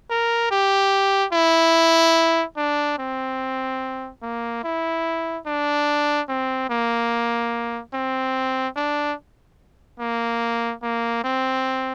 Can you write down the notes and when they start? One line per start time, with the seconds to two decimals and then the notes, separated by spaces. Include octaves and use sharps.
0.10 A#4
0.51 G4
1.33 E4
2.57 D4
2.99 C4
4.22 A#3
4.64 E4
5.47 D4
6.29 C4
6.70 A#3
7.94 C4
8.76 D4
10.00 A#3
10.83 A#3
11.24 C4